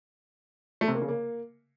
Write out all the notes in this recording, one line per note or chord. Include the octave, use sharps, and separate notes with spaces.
A3
C3
A#3
C#3
A#3